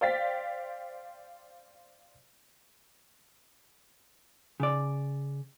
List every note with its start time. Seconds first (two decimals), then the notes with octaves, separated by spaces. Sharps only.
0.01 C5 D5 F5 G5 A6 B6
4.60 C#3 D5